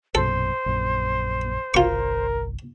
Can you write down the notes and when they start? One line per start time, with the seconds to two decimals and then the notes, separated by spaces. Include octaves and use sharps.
0.15 A#1 F#2 B2 A4 C5
0.66 A#1 F#2
1.74 G1 C2 F4 A#4 C#6